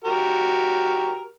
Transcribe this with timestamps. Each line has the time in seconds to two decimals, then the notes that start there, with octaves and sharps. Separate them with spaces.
0.04 F#4 G4 A#4